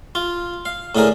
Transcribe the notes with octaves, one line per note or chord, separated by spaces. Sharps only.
F4
F5
A2 D3 G#4 A#4